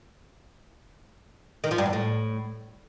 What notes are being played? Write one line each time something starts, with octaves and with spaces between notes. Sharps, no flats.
D#3
F3
G2
E2
A2